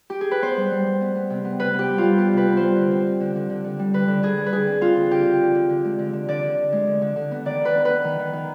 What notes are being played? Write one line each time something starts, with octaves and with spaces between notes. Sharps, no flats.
G4
G#4
B4
B3 C5
G3
G3
G3
B3
B3
C3
B3
C3 B4
B3 G4
G3
F4
G3
B3 G4
C3 B4
B3
C5
G3
D3
C4
C4
D3
D3
D3
D3
G3
D3 B4
D3
D3 G#4
G3
B4
D3 G#4
C4
C4 F4
D3
D3 G4
D3
D3
D3
D3
G#3
D3
D3
D3 D5
D3
D3
G#3
D3
D3
D3
B3
D#3 D5
D#3 B4
B3
B3 B4
D#3
D#3
D#3